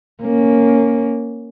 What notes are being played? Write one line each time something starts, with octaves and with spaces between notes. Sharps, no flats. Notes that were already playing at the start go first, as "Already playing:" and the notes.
A#3 C#4